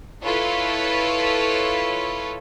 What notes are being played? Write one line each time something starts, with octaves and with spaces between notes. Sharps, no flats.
E4 F4 A4 B4 C#5